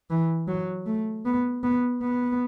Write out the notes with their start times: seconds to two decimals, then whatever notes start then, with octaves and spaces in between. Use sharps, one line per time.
0.10 E3
0.48 F#3
0.86 A3
1.26 B3
1.63 B3
2.02 B3